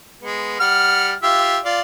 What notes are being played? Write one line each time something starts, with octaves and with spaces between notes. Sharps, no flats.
G#3 B3
G3 F#5 F6
F4 G4 E5
F4 D5